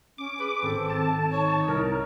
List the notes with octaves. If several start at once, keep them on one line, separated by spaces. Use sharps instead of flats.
C#4 D6
G#4 B4
G#1 C4 A4
A5
D#4 C#5
C2 A#4